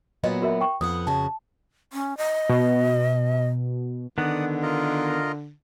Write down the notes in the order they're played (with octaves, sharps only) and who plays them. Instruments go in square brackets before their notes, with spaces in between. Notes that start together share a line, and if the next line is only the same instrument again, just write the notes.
[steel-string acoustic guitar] A#2 F#3 B3 [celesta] D#5
[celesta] F#4 A#4 E5
G5 C#6
[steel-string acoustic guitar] F2 B3 F#5 [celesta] D#6
[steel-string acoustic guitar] F2 C#3 F#4 [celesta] A5
[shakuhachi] C#4
D#5
[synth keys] B2
[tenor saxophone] D3 [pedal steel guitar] D#3 B3 [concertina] D5 F#5 D#6
[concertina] F4 A#4 D#5